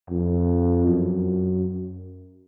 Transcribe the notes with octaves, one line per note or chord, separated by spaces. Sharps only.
F2
F#2